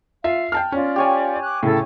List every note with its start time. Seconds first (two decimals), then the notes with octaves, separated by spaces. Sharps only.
0.24 F4 E5 F5
0.52 G5 A5 F6
0.72 C#4 F4 D5
0.96 G4 C#5 G#5
1.41 D6 F#6
1.63 A2 C#3 A4